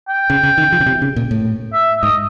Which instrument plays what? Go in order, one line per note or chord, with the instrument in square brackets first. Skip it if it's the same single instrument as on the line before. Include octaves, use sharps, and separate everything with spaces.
[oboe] G5
[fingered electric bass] C#3
C#3
D#3
F3
C#3
C3
C#3
A#2
A2
[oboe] E5
[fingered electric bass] G#2 [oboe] D#5